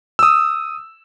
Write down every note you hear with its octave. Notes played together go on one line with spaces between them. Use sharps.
D#6 E6